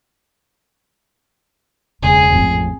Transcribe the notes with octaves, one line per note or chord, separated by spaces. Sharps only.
E1 C#2 C#3 A#3 G#4
A1 F2 G#2 C4